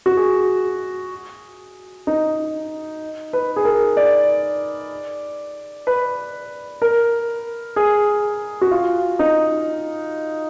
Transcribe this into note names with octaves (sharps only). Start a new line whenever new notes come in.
F#4
G#4
D#4
B4
G#4
A#4
D5
B4
A#4
G#4
F#4
F4
D#4